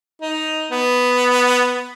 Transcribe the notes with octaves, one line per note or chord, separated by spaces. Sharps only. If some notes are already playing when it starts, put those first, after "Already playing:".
D#4
B3